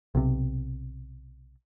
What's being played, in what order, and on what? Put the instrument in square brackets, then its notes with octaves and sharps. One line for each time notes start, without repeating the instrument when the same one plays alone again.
[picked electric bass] B1 C3